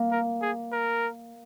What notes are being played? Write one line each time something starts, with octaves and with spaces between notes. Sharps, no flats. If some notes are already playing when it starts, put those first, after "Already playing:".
Already playing: A#3
A#4
G#4
A#4